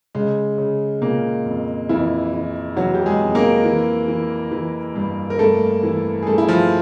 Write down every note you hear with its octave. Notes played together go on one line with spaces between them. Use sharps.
C#3 G#3
C#3
A#2 C#3 A#3
F2
F2 E3 E4
E3
E3 F#3 F#4
G4
G#3 G#4
F2
A#3 A#4
E3
E3
E3
G2
A#4
G2 A3 A4
E3
G#4
G2 A3 A4
E4
F3 F4